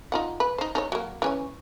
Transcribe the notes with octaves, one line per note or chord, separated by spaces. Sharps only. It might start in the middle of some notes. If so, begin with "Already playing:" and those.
D#4 F4 F#5
B4
D#4 C5
D#4 A4 C#5
F#3 A#3
E3 C#4 C#5